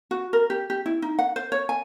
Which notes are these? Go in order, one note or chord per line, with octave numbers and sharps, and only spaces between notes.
F#4
A#4
G4
G4
E4
D#4
F#5
C5
C#5
G#5